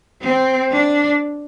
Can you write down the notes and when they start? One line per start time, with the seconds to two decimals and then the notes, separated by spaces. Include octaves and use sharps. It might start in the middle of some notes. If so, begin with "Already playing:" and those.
0.21 C4
0.71 D4